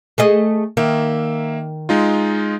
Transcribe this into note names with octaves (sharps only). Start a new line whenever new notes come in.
A3 G#4 D#5
D#3 A#3 E5
G#3 D#4 F4